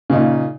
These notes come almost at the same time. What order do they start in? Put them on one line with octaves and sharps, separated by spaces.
C#3 D#4 A#2